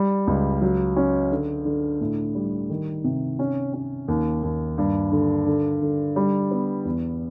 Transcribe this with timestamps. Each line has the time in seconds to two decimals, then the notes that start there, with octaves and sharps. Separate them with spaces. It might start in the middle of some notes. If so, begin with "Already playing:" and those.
Already playing: G3
0.27 C#2
0.61 F#3
0.96 C#4
1.31 D3
1.65 D3
2.01 A2
2.35 G3
2.70 D#3
3.04 C3
3.39 C#4
3.74 C#4
4.08 D#2
4.43 D#2
4.78 G2
5.12 D3
5.46 D3
5.82 D3
6.16 G3
6.51 B3
6.85 E2